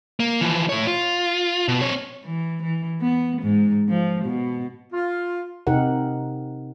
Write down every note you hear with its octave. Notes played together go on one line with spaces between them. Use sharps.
A#3
E3 F3
A2 C#5
F4
B2
C4 C#5
E3
E3
B3
G#2
F3
B2
F4
C3 D#4 G4 A#4 F#5